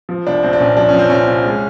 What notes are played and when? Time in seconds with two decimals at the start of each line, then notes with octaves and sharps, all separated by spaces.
0.09 F3
0.27 C2 D4
0.43 C2 C4
0.53 D4
0.60 A#2 C#4
0.77 F3 D4
0.89 C#4
0.94 F3 C4
1.10 C2 C#4
1.28 C2
1.45 G#3